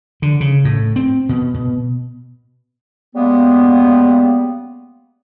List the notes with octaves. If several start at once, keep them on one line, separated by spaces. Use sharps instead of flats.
D3
C#3
A2
C4
B2
B2
C#3 G3 G#3 A#3 B3